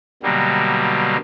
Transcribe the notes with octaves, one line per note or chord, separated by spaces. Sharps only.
B2 D3 F#3 G3 A#3